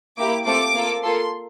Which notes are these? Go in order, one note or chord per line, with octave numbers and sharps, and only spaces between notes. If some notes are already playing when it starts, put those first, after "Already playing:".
A#3 E4 G4 D6
A3 C4 F4 A4 D6
A#3 F4 A4
A#3 F4 A4 C6